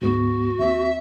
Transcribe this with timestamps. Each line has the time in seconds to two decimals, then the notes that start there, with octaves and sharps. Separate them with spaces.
0.02 D2 G#2 B3 F#4
0.59 D#2 C4 E5